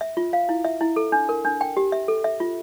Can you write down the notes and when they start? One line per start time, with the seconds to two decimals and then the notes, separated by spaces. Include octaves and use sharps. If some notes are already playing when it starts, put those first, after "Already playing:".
0.01 E5
0.17 F4
0.33 F5
0.49 E4
0.65 E5
0.81 E4
0.96 A4
1.12 D4
1.29 A#4
1.45 D4
1.61 G5
1.77 G4
1.92 E5
2.08 A4
2.24 E5
2.40 F4